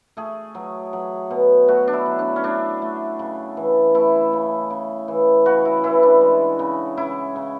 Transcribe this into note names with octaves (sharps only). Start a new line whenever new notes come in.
A3 G#4
F#3
F#3
B2
A3 F#4
D4
E4
F#3
D4
C#4
A3 D4
A3
C#3
E3
A3 E4
C#3
C#3
E3
C#3 F#4
E4
E3 E4
D4
G#3
C#3
C#3 E4
C#3